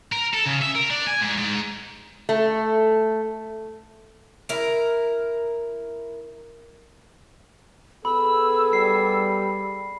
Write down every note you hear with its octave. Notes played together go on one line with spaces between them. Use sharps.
A#4
A4
C#3
E5
A#4
D4
G#5
G#2
G#2
A3
E4 A#4
B3 G#4 A4 B5 E6
G3 C7